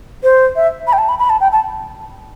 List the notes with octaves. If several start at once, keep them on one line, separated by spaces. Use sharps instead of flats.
C5
E5
B5
G5
A5
B5
B5
A5
G5
A5